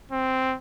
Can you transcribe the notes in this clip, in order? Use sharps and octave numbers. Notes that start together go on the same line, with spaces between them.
C4